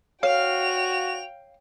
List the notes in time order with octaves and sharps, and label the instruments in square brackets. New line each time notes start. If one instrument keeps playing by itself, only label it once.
[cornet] F#4 [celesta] C#5 [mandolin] F5 [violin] G5 F7